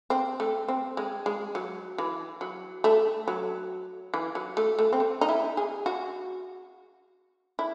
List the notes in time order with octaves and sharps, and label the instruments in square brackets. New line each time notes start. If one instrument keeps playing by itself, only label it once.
[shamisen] C4
A3
C4
G#3
G#3
F#3
E3
F#3
A3
F#3
E3
F#3
A3
A3
C4
A3
D#4
E4
G#4
F#4
E4